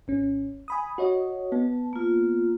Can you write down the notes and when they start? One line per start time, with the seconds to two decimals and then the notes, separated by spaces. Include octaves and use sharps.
0.08 G#1 C#4
0.68 G#5 B5 D#6
0.98 F#4 C#5 D#5
1.52 B3 A5
1.93 A#3 F4